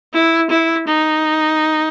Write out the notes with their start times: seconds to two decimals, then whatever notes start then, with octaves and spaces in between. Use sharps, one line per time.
0.14 E4
0.50 E4
0.87 D#4